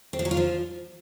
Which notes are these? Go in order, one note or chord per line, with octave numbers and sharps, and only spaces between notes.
C4
F3
F#3
F4
F3